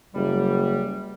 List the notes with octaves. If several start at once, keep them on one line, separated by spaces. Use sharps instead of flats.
F#1 G3